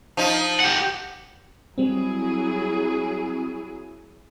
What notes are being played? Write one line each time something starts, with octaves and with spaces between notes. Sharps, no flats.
F3 D#4
G4 F#5
F#3 G3 C4 E4 G#4